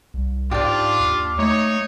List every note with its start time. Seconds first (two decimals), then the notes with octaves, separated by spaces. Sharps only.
0.14 C2
0.51 G#2 D4 F4 G4 D5
1.00 D#2
1.39 A3 D#4 C#5